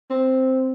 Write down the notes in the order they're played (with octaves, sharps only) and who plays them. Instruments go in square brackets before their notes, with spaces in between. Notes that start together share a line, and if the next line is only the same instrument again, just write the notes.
[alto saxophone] C4